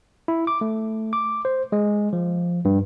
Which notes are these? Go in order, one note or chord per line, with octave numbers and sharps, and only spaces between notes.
E4
D6
A3
D6
C5
G#3
F3
G2